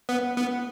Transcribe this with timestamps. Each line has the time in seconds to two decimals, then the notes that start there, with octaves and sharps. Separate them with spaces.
0.09 B3
0.37 B3